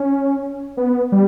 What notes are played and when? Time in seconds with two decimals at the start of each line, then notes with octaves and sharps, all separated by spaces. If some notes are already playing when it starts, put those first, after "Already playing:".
Already playing: C#4
0.77 B3
1.12 G3